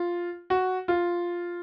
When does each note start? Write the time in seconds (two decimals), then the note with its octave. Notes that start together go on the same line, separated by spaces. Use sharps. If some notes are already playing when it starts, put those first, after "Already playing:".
Already playing: F4
0.50 F#4
0.88 F4